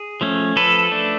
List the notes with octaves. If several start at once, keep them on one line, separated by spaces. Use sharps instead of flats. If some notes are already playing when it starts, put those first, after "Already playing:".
Already playing: G#4
F3 A3 C#4
F3 A4 B4
A3 D4